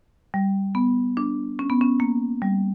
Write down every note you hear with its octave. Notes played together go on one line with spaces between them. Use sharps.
G3
B3
D4
C#4
B3
C#4
A#3
G3